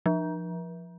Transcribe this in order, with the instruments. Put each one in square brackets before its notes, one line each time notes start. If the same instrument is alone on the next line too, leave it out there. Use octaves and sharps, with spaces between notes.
[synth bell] F3